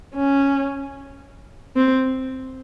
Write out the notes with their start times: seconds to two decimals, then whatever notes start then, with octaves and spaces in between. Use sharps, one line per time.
0.15 C#4
1.76 C4